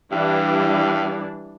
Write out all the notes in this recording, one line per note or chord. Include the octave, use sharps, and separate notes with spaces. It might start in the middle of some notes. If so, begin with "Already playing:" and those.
G2 E3 G3 D4